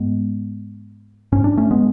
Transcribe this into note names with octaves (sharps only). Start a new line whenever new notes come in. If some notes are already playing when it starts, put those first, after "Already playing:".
Already playing: G#2 G#3 B3
G#2 C#4
D4
A3 C#4
G#3 B3